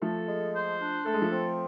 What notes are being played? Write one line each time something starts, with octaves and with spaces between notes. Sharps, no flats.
F3 A3 A4
G#3
C5
D4
A3 A4
G#3
F3 A3
C4